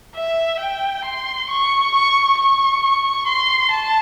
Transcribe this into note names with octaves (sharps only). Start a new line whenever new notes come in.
E5
G5
C6
C#6
C#6
C#6
C6
A5